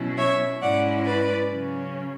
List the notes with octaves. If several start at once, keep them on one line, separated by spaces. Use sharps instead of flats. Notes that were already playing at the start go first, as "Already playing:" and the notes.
Already playing: B2 F#3 C#4 E4
C#5 E5
G#2 G#3 C#4 E4 D5 F#5
B4 D5
C#3 F#3 C#4